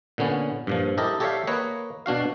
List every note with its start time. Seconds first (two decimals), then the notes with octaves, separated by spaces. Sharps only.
0.18 A#2 D3 B3 C#4
0.67 G2 A#2 F3
0.97 E4 G4 A4 A#4 D#5
1.20 G4 A4 C#5 D5 E5 F5
1.47 A#3 B4 C#5 D#5
2.06 B2 D4 F#4 F5